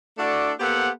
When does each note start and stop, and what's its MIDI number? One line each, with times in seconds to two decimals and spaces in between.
0.18 0.51 57
0.18 0.51 62
0.18 0.51 64
0.18 0.51 66
0.18 0.51 69
0.18 0.51 74
0.59 0.88 58
0.59 0.88 59
0.59 0.88 67
0.59 0.88 69
0.59 0.88 72
0.59 0.88 78